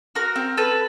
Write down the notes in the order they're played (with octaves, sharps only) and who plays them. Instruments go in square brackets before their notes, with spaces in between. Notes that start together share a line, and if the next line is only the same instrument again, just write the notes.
[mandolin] F#4 A#4
C4
A4 B4